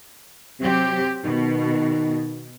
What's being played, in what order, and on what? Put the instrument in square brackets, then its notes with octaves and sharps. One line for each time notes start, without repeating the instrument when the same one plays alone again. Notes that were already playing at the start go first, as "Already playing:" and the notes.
[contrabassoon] C3 [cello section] F#3 C4 G4
[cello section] B2 [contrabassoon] D#3